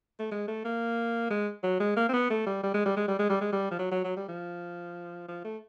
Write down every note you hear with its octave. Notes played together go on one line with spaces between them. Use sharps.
A3
G#3
A3
A#3
G#3
F#3
G#3
A#3
C4
B3
A3
G3
G3
G#3
G3
G#3
G3
G#3
G3
G#3
G3
F3
F#3
F#3
F#3
G3
F3
F3
A3